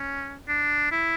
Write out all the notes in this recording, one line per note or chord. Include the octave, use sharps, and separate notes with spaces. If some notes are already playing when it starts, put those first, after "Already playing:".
Already playing: C#4
D4
E4